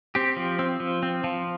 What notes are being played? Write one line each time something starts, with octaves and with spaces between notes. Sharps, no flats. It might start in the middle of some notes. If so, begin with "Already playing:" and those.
C4 G4
F3
C4
F3
C4
F3